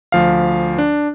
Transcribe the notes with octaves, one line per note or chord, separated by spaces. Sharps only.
D2 F3 F5
D4